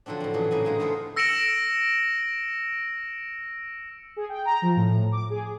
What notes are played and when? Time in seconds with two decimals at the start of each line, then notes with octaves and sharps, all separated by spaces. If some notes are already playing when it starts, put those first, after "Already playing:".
0.06 D3 F3 F#3 C4 D4
0.20 A2 D4
0.34 F#2 A#2 E3 D4 G#4 F#5
0.51 A2 C#3 A#3 G#4 D#5 G#5
0.65 D3 G#3 D#4
0.80 G#3 A3 B3 A4 A#4 C5
1.16 E6 A#6 C#7 D7 E7 F#7
4.16 G#4
4.29 G5
4.45 A#5
4.62 F3
4.76 A2
5.11 D6
5.30 G#4